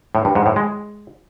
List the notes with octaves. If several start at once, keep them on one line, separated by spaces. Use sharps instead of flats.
A2
G2
G#2
A2
G#3